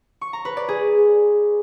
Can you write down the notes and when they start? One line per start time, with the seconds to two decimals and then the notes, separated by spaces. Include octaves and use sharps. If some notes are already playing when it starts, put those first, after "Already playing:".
0.21 C#6
0.33 A#5
0.45 B4
0.57 D5
0.69 G#4